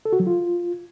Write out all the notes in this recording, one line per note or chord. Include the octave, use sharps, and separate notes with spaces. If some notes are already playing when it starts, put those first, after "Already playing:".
A4
F#4
F#3
F4